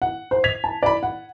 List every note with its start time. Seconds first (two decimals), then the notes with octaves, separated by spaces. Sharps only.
0.02 F#5
0.31 C5
0.44 G#6 B6 F7
0.64 A5
0.83 D5 B5
1.03 F#5